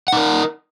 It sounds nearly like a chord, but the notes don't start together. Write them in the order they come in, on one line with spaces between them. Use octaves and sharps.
F#5 D#4 A#4